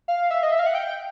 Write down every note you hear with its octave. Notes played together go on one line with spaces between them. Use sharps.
F5
E5
D#5
E5
F5
F#5
G5